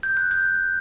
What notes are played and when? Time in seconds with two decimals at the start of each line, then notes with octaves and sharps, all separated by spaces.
0.03 G6
0.17 F#6
0.31 G6